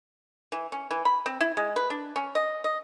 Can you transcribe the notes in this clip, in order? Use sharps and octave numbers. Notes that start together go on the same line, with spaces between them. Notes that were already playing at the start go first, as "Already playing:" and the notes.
E3
C#4
E3
B5
C4
E4
G#3
B4
D4
C#4
D#5
D#5